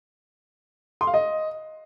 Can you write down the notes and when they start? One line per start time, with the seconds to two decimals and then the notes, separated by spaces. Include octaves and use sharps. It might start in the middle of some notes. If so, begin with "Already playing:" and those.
1.01 C6
1.07 F5
1.14 D#5